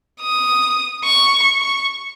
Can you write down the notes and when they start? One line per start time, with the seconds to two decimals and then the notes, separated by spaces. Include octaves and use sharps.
0.21 D#6
1.05 C#6
1.61 C#6